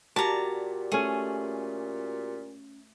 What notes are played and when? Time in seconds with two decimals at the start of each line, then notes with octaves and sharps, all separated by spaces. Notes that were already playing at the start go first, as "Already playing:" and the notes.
0.16 A#2 F#4 G4 D5 A5 A#5
0.92 A3 C#4 G#4